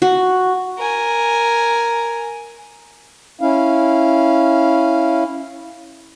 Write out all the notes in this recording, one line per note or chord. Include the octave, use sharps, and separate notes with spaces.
F#4
A#4 G#5
C#4 E4 F5